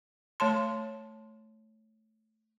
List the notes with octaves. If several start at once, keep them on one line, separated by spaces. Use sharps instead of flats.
A3 C#5 A5 C6